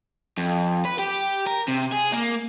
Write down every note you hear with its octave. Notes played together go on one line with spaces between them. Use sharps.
F2
B4
G4
A#4
C3
G#4
A#3